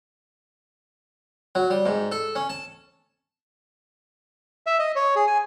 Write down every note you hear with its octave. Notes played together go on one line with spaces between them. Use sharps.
F#3
G3
G#2
A4
C#4
A5
E5
D#5
C#5
G#4
G#5